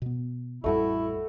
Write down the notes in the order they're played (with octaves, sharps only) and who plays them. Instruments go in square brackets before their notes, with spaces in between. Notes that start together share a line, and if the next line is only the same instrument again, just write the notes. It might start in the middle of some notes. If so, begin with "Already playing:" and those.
[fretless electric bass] B2 B3
[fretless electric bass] A1 F2 G3 [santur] A3 F#4 [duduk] E4